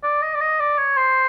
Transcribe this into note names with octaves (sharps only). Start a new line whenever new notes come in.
D5
D#5
D5
D#5
D5
C#5
C5